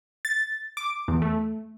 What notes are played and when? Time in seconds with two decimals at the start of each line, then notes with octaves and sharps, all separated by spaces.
0.25 A6
0.77 D6
1.08 E2
1.22 A3